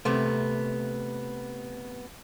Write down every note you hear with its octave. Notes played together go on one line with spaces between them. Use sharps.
C3 A3 B3